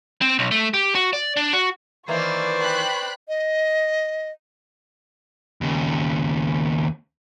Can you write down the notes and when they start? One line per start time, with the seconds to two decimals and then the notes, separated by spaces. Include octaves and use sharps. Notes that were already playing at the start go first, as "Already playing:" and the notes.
0.22 C4
0.39 B1
0.51 A3
0.74 G4
0.95 F#4
1.13 D5
1.37 D4
1.53 F#4
2.08 D#3 E3 A#3 B4 C5 D5 C#6
2.61 G5 B5 F#6
3.28 D#5
5.61 D#2 C#3